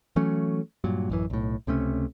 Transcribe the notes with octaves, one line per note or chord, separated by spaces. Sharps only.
E3 F#3 A3 C#4
G2 A#2 F#3
A1 F#2 E3
B1 A2
C#2 C3 A3 C#4